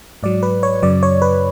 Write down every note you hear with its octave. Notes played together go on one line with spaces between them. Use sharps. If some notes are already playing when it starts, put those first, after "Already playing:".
G#2 F#3 D5
B4
C#5
F#2 C#3 F#3 D5
C#5
B4